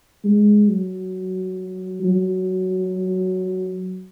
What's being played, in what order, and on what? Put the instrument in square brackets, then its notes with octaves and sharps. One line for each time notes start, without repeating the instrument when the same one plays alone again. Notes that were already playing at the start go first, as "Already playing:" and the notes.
[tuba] G#3
F#3
F#3